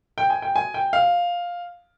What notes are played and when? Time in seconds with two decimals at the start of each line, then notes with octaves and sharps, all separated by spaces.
0.18 G5
0.30 G#5
0.42 G5
0.56 G#5
0.74 G5
0.93 F5